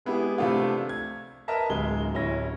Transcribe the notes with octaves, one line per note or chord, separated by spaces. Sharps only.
G#3 B3 E4 G4 G#4
C3 F3 A3 D4 F4
G#6
A#4 B4 D#5 E5 A5 A#5
D1 G#3 G7
D1 C#4 E4 A#6